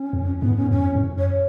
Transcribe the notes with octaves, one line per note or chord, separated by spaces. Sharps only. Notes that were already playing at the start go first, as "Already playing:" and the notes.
Already playing: C#4
F2
G#2 B3
C#4
F2 C#4
G#2
F#2
C#5